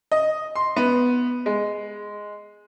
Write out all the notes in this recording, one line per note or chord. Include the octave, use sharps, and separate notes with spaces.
D#5
C6
B3
G#3